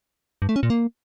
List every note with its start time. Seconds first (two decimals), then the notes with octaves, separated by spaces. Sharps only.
0.42 G2
0.49 A3
0.56 C#4
0.63 A#2
0.70 A#3